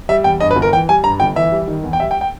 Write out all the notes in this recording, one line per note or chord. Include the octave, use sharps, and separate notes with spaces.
G3 E5
E2 G5
G2 D#5
B4
G1
A#4
E3 G5
G3 G#5
G2 A#5
G1 G5
E3 E5
G3
D#3
E2
G5
G3 E5
G5
G5